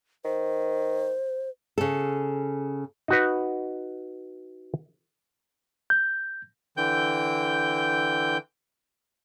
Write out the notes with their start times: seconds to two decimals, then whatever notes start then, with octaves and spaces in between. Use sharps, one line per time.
0.25 D#3 C5
1.78 C#3 A4
3.08 D#4 F#4 B4
5.90 G6
6.77 D3 E3 G5 G6